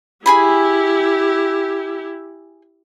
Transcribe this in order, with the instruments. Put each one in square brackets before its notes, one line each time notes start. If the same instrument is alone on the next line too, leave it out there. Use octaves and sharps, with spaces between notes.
[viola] E4 G4 [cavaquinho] G#4 G#5 B5